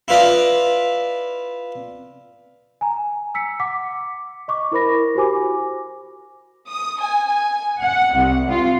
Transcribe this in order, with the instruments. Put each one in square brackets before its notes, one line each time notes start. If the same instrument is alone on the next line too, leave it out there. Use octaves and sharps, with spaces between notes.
[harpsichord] E4 F4 B4 D5 D#5
[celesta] G#5 A#5
E6 B6 C#7
F#5 D6 B6
D#5 C#6 D6
E4 A#4 C5 B5 A#6
F#4 G4 C5 G#5 D6
[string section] D#6
G#5
G#5
F#5
C2
F4